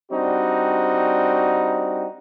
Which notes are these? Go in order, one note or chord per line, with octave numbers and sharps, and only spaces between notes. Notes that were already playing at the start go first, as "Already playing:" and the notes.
G3 C4 D4 D#4 F#4